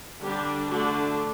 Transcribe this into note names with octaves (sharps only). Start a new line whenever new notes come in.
D3 G3 D4 G4
D3 A3 D4 F#4